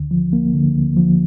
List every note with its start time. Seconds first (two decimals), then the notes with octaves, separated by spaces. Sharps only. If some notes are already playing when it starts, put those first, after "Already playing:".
Already playing: D2 D3
0.11 F3
0.33 A#3
0.54 D3
0.75 D2
0.97 F3